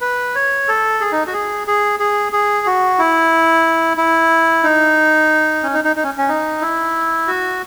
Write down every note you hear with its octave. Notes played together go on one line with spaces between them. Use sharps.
B4
C#5
A4
G#4
D#4
F#4
G#4
G#4
G#4
G#4
F#4
E4
E4
D#4
C#4
D#4
D#4
D#4
C#4
C#4
D#4
E4
F#4